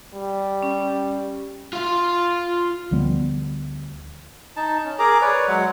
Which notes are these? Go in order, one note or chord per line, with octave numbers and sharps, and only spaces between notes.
G3
C#4
F4 F5
D2 F3 G3 B3
D#4 A5
C#4
G#4 A#4 A#5 D6
B4 C#5 D5
F#3 G#3 F#5